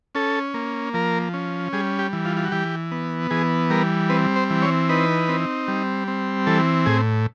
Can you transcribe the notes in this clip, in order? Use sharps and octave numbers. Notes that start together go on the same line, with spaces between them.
C#4 A4
A#3
F3 A#4
C#4
G3 G#4
G4
E3
F4
F4
F#4
E3 G4
B3
E3 G#4
G3 A#4
C4 B4
C5
E3
C#5
D#4 B4
C4
G3
C4
E3 A4
A2 G#4